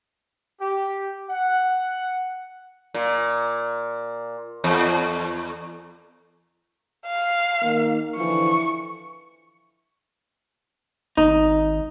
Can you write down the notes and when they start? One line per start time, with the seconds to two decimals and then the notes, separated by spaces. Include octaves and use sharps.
0.60 G4
1.30 F#5
2.94 A#2
4.64 E2
7.07 F5
7.62 D#3 A#3
8.17 D3 E3 F3 C#6
11.17 G#1 D#4